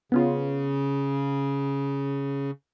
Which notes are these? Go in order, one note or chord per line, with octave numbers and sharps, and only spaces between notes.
C#3 B3 C#4 F4